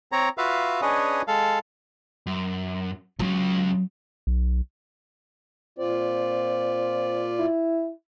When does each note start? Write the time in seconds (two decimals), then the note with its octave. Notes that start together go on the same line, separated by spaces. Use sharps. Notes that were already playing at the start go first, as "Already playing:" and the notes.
0.12 C4 C#5 A#5
0.38 F4 F#4 B4 E5 F5
0.82 C#4 D4 G#4 B4 C#5 D#5
1.28 G#3 A4 F5
2.27 F#2
3.19 C#2 C#3 F#3
4.27 B1
5.78 A#2 C4 F4 D5
7.39 E4